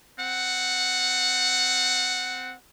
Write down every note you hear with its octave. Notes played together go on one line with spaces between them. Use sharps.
C4 F#5